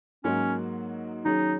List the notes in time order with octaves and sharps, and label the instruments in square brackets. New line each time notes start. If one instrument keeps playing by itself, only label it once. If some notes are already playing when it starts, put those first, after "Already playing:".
[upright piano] G#2 F#3 A#3 D#4 F#4 [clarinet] C#4
[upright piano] D#3 F#3 C#4 G#4 [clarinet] D#4